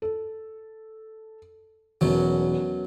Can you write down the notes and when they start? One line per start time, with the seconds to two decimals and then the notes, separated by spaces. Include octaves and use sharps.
0.02 A4
2.01 E1 F#2 B2 F#3